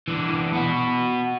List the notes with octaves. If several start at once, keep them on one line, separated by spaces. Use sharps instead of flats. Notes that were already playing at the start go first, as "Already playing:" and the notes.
E3 D4
B3 F#4